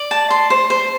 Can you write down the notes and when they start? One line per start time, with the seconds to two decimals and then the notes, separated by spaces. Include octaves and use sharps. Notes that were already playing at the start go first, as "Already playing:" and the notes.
Already playing: D5
0.11 A5
0.30 C6
0.50 C5
0.70 C5